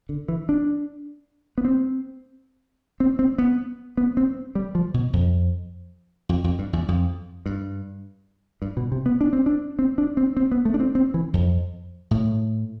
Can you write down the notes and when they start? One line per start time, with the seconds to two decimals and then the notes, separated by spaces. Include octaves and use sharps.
0.09 D3
0.28 E3
0.49 D4
1.58 B3
1.65 C4
3.00 C4
3.19 C4
3.38 B3
3.97 B3
4.17 C4
4.55 G3
4.75 F3
4.94 B2
5.13 F2
6.29 F2
6.44 F2
6.59 G2
6.73 E2
6.88 F2
7.46 G2
8.62 G2
8.77 B2
8.92 C3
9.06 B3
9.21 D4
9.33 C4
9.46 D4
9.79 C4
9.98 D4
10.17 C4
10.37 C4
10.52 B3
10.65 A3
10.74 D4
10.80 C4
10.95 C4
11.14 E3
11.34 F2
12.11 A2